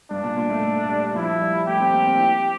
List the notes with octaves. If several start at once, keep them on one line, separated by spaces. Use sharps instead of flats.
G2 D4
A#2
A#2
A3
A3
G3
F3 E4
G3
A3 G4
C4
A#3
C4
E4